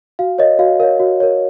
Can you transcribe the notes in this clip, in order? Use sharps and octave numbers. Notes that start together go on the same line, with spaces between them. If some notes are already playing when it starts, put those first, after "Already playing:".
F#4 F5
A#4 C#5 D#5
F#4 F5
A#4 C#5 F5
F#4
A#4 C#5